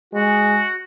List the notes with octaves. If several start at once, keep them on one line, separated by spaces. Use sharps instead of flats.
G#3 F#4